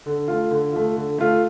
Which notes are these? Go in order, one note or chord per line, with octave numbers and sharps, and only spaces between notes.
D3
A3 F4
D3
A3 F4
D3
A3 F4